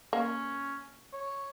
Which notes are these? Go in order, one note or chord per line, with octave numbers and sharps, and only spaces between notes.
A#3 C#4
C#5